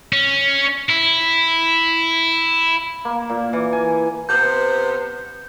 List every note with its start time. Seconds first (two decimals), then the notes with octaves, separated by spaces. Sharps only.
0.13 C#4
0.89 E4
3.05 A#3
3.30 A#2
3.53 E3
3.73 G#5
4.29 C3 B3 C5 G6